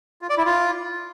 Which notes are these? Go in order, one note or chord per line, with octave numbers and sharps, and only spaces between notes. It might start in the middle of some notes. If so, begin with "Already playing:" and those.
F4
D5
E4
F4